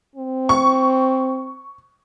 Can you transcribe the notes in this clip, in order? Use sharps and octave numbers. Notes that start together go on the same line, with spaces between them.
C4
C#6